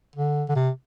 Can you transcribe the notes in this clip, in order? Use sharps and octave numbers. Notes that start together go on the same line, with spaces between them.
D3
D3
C3